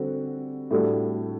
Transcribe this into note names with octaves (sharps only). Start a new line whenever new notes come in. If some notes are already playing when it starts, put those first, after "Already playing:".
Already playing: D3 G3 C4 F#4
A2 G3 D4 F#4 A4